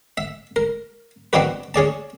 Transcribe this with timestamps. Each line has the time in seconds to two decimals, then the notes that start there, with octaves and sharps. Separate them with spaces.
0.17 E5
0.56 A#4
1.33 B3 C4 D4 D#4 F#4 B4
1.74 C#4 G#4 D5 A5